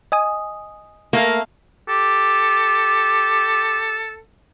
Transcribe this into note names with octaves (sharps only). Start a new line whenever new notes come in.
D#5 G#5 D#6
A3 A#3 F5
G4 A4